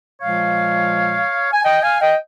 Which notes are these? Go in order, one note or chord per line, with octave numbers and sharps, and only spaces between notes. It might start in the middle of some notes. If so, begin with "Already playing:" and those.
A#2 F3 G#3 C#5 F5
G#5
D#5 G5
F5 G#5
D#5 G5